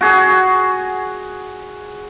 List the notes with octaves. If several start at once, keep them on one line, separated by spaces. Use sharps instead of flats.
F#4 G#4